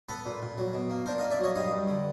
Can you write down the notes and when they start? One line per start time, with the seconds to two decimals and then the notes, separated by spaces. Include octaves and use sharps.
0.09 B3 A4 B4
0.26 A#2
0.42 A#2
0.58 F#3
0.73 B2
0.90 A#3
1.06 D4 A#4 C5
1.18 D#5 F5
1.23 A#3
1.31 D5 E5
1.39 F#3 C#5 D#5
1.55 G2 D#5 F5
1.71 G2
1.88 D3